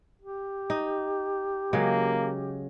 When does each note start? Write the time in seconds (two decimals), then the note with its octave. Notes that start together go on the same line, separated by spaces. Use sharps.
0.22 G4
0.70 D#4
1.73 C#3 F#3 G#3 A#3